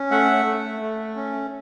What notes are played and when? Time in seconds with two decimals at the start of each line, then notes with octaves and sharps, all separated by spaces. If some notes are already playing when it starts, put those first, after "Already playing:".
Already playing: C#4
0.11 A3 E5 F#5
0.46 A3
0.81 A3
1.16 C#4